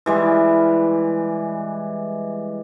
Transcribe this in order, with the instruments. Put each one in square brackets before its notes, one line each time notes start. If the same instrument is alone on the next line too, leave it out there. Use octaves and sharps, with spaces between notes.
[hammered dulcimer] E3 G3 G#3